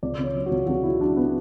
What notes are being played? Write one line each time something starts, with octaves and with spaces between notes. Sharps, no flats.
C#2 D5
C#3
C#5
F#3
F#4
C#2
C#2 F#4
C#3 E4
F#3 D4
B3